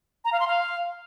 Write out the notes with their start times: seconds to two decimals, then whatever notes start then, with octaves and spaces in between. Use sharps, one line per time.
0.25 A#5
0.32 F5
0.40 C6
0.48 F5